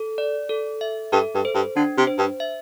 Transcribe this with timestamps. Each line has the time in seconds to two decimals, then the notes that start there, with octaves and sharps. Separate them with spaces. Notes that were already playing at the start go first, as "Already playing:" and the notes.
Already playing: A4
0.18 D5
0.49 A4
0.81 E5
1.12 G2 A4
1.34 G2
1.45 C5
1.55 G2
1.76 D3 D4
1.97 C3
2.07 C5
2.18 G2
2.40 E5